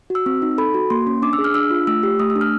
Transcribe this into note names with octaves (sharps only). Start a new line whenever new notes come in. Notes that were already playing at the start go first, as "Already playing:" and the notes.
F#4
E6
C4
D#4
A4 B5
F#4
A#3 C6
C#4
D4 D6
E6
G#4
F6
D4 E6
F4
A3 E6
G4
A3 D#6
E6
D4
F6